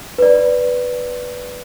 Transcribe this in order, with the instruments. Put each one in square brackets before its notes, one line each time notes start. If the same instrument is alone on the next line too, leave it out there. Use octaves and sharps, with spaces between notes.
[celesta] B4 D5